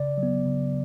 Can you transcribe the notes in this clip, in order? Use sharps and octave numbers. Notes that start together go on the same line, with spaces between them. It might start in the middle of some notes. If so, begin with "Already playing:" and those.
Already playing: C#3 D5
F#3
B3
C#3